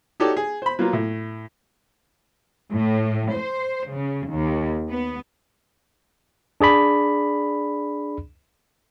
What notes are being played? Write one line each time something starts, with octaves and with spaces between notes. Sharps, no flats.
D#4 F#4 G4 A4 C#5 D5
G#4
C5 B5
F#3 A#3 B3 F4
A2
A2
C5
C#3
D#2
B3
D4 G#4 D5 B5